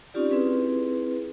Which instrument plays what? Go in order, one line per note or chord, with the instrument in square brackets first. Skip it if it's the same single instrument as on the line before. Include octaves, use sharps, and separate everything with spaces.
[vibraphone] C4 C#4 D#4 F4 G4 D5
C4 E4 G#4 B4